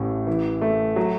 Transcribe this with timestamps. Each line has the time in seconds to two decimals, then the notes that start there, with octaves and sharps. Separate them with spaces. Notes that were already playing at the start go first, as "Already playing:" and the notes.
Already playing: A1 A2
0.27 E3
0.61 A3
0.96 F#3